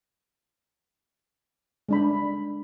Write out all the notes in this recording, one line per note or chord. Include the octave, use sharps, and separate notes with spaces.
G#3 D4 B5